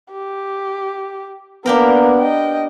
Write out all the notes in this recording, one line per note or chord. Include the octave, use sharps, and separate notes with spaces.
G4
A#3 B3 D4 G4 A#4
D#5 G5